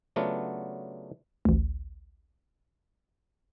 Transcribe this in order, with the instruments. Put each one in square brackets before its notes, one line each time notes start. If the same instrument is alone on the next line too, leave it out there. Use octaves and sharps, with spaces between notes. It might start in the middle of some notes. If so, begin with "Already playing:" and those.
[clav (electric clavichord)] C#3 F#3 A3 B3 D4 F4
[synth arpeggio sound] A1 D2